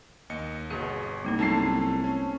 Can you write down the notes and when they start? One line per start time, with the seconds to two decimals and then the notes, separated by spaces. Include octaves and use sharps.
0.30 D#2 D#5 C#7
0.70 G1 B2 G#4
1.24 C2 G3 A#3 D#4
1.39 F#2 A3 A5 C7
2.04 C#4